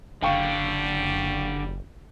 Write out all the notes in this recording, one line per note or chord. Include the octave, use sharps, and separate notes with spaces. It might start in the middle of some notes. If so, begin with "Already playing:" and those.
F#1 D3 G3 F5 G5 C#6